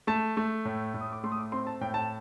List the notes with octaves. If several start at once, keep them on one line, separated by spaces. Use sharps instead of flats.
A3 A5
A3
A2
A2
D#6
D6
A3 C6
D#6
D6
C4 C6
A5
A2 G5
A5